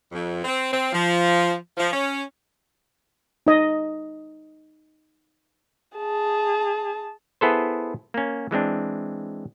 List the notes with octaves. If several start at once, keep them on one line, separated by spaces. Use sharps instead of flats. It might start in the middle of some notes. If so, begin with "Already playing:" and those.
F2
C4
C4
F3
F3
C#4
D#4 D#5
G#4 A5
B3 E4 G#4 A4 B4 C5
A#3 C#4
E3 G#3 C4 D4